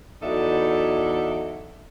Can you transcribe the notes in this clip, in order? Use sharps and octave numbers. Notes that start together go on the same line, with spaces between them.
E2 F#3 D#4 A4 D5 E5